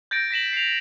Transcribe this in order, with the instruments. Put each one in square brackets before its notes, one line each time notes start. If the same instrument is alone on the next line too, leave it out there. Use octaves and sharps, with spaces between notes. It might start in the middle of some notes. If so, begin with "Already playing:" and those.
[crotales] G6 A6 A#6 D7
A#6 B6 E7 F#7
C7 F7